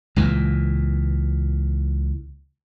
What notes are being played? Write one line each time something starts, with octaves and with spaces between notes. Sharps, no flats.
C#2 A#2 E3